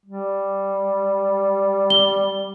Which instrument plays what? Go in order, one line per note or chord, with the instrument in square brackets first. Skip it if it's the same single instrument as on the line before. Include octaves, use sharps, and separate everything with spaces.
[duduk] G3
[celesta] G7